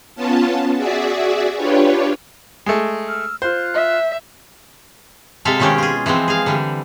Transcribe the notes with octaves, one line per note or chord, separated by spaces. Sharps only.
B3 C#4 F4 A5
F#4 G#4 D5 E5
D4 F4 G4 B4 C#5
G#3 A3
E6 F6
F4 C5 F#6
E5
C3 G#3 A4 E5 F5
B2 D#3 G#3 C#4 G4
F4 G#4
E3 F3 G#3 C4
G#4 F5
D3 E3 G3